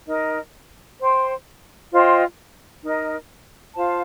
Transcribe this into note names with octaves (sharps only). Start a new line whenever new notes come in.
D#4 A#4 D#5
C5 G5 C6
F4 C5 D#5 G5
D#4 A#4 D#5
F4 C5 F5 A5